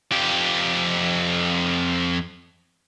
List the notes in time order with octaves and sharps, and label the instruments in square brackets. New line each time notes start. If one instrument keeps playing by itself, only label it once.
[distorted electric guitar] F2 G4